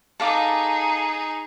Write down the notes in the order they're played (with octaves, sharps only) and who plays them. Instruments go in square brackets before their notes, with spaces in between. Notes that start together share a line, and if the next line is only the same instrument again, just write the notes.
[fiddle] D#4 G#4 [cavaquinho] A4 F5 D6